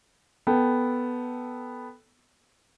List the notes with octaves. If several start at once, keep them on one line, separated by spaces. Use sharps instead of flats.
B3 A4 G5